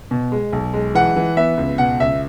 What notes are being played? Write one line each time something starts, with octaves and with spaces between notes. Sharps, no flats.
B2
G#3
B1
G#3
E3 F#5
E3
B3 E5
C#2
B2 F#5
C#2 E5